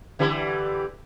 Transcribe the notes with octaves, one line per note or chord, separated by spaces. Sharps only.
D3 E3 G3